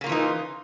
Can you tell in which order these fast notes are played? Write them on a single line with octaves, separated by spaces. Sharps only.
C#3 A#3 F4 E3 D#4